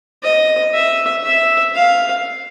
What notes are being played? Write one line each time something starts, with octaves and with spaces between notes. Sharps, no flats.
D#5
E5
E5
F5